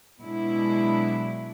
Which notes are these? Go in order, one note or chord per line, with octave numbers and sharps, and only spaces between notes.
B2 F#3 G#3 D4 E4